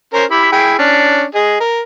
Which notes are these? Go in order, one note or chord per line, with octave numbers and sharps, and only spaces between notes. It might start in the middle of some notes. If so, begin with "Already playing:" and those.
C#4 A#4 C5
E4 G4 B5
E4 G#4 G5
C#4 D4
G#4 D#5
A#4